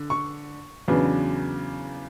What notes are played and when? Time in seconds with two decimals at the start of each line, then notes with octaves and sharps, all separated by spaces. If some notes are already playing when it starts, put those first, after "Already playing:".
Already playing: D3
0.10 C#6
0.88 E2 C#3 F#3 B3 D4